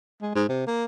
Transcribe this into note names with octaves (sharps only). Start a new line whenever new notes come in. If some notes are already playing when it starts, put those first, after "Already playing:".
G#3
G#2
C3
A#3